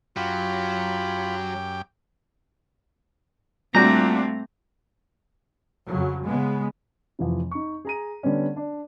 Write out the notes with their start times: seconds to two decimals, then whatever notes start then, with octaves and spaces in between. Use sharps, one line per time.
0.17 F#2 F#3 F4 G4 G5 B5
3.75 A#2 G3 A3 C4 D4 F#4 A#5
5.88 F2 C#3 F#3
6.26 C#3 G#3 B3
7.19 F1 E3 F3
7.51 D#4 C#6
7.85 G#4 A#5 D#7
8.23 D3 G3 B3 C#4
8.56 D4